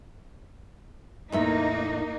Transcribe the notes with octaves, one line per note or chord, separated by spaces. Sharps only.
E2 A2 A#3 D#4 E5